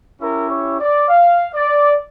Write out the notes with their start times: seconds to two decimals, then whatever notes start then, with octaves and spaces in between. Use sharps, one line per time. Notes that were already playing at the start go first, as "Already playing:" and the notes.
0.20 C#4 E4 G4 A#4
0.50 C#5
0.80 D5
1.08 F5
1.53 D5